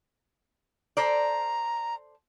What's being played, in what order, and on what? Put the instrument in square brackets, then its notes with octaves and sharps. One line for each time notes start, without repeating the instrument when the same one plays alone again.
[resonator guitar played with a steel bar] A4 C5 D5 [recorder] A#5